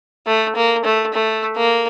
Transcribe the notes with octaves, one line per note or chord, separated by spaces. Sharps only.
A3
A#3
A3
A3
A#3